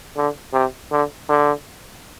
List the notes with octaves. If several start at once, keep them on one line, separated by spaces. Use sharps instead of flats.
D3
C3
D3
D3